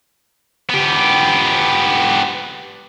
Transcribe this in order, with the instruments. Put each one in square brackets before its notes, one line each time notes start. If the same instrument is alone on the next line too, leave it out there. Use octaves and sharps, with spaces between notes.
[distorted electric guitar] B3 G4